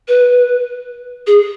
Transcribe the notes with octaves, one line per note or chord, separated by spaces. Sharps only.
B4
G#4